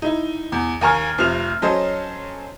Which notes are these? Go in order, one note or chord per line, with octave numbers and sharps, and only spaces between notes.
D#4 E4
E2
D#2 A#3 G#5 A#5 C#6 F6
F1 C3 F3 F6 F7
F#3 C#4 A4 C5 D#5